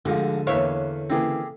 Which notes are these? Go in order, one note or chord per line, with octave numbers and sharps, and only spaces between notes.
D2 G#2 D3 F3 F4 G4
E2 A#3 E4 B4 C#5 E5 F5
C#3 E3 A#3 C4 G4 G#4